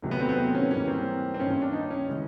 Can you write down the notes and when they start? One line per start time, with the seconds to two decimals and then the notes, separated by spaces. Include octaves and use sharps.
0.02 E2 C3 D#3 F#3 A3
0.11 B3
0.20 C4
0.29 B3
0.37 C4
0.55 C#4
0.71 G#2 E3 G3 A#3 C#4
0.88 C4
1.34 C4
1.39 G2 D#3 G3 A#3 C#4
1.50 C#4
1.62 D4
1.73 D#4
1.90 C#4
2.08 C#3 E3 G#3